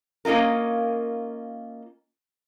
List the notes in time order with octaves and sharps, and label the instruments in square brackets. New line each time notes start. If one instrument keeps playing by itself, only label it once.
[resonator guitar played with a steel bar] A#3 C#4 D#4 F4 A#4